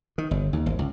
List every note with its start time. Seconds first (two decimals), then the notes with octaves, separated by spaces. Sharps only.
0.18 D#3
0.31 G1
0.53 D#2
0.66 G#1
0.79 C#2